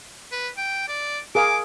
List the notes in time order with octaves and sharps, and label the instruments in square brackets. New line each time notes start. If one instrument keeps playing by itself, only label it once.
[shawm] B4
G5
D5
[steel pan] G#4 A#4 F5 [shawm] D6